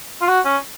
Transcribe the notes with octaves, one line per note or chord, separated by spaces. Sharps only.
F4
F#4
C#4